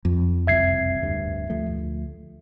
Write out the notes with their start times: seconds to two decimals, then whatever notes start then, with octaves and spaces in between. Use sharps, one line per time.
0.05 F2
0.47 F#1 C2 C4 E5 G#6 C7
1.00 D1 D2 G2
1.50 D2 F3 A3